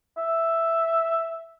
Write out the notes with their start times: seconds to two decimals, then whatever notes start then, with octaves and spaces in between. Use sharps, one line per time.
0.17 E5